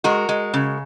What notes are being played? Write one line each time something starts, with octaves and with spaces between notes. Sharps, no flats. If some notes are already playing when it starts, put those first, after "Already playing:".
G#3 F#4 A#4
G#3
C#3